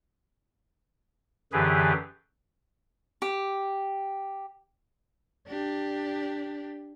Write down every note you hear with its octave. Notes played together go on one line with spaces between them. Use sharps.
F#2 D3 E3 G4 G#4 B4
G4
D4 G4